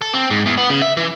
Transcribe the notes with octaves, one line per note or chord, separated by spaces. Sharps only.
A4
C4
G#2
E2
B3
C#3
E5
E3